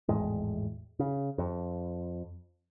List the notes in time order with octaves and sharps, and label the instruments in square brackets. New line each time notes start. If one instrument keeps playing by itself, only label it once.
[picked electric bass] G#1 E2 A2 G#3
C#3
F2